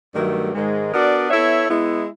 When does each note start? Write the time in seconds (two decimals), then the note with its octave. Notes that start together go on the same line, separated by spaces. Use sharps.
0.15 G2 D#3 F#3 A3
0.53 G#2 D#3 G#3
0.91 B3 D4 F#4 A#4 D5
1.30 B3 E4 A4 C#5 E5
1.69 G#3 B3 E4